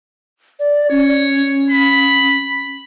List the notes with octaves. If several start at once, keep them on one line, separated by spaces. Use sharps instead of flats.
D5
C#4 C#5
B5